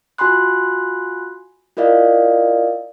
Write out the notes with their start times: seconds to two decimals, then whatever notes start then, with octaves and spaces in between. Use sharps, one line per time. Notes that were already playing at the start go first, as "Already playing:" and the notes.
0.18 F4 F#4 G#5 B5 C6 F#6
1.77 E4 F4 A#4 D5 D#5 F5